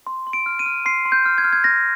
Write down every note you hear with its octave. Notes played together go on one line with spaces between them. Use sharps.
C6
C6
D7
F6
D#7
F6
C6 C7
C6
G6
F6
G#6
F6
G#6
G6 A#6